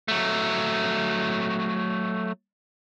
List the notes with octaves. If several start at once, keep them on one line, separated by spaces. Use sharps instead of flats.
F#3 A3